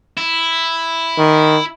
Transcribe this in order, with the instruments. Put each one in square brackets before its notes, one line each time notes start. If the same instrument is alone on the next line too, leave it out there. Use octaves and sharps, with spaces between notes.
[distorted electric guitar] E4
[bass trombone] D#3